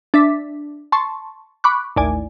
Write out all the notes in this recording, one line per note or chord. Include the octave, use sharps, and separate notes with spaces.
D4 E5 B6
A5 C6 C#6
B5 C#6 D6 F#6
A1 D#2 D5 G#5